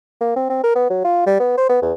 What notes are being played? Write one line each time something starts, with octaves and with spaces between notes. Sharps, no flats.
A#3
C4
C4
A#4
B3
F#3
F4
G3
B3
C5
B3
E2